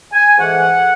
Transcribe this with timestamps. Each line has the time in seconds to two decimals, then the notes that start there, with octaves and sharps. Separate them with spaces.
0.12 G#5
0.38 G#2 E3 A3 F#5